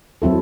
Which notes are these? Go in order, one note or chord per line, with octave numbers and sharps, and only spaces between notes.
F#3 C4 E4 A4